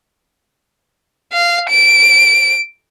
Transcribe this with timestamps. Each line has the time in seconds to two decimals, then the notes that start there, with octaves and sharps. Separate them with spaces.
1.33 F5
1.69 D7